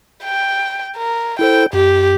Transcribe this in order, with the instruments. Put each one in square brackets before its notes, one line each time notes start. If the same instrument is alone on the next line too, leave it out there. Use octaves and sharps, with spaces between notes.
[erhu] G5
A#4
[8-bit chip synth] E4 A4 C5 [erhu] G5
[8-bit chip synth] F#2 [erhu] G4